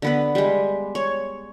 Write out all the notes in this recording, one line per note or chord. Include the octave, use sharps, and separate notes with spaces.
D3 B3 B4
G3 G#3
C#5